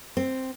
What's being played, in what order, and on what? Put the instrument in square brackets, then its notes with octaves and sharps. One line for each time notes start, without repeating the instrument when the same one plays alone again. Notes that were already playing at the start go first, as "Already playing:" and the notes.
[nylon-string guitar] C4